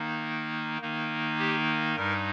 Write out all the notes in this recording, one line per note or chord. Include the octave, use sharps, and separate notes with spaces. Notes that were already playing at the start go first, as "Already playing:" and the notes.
Already playing: D#3 A#3 D#4
D#3 A#3 D#4
G4
G2 G3 D#4 A#4